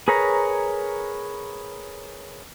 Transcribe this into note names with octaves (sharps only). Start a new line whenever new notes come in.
G#4 A#4 B4 C#5 A#5